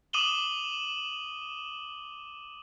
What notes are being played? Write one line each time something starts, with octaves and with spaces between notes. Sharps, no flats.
D6 D#6 D#7 E7 F#7 G7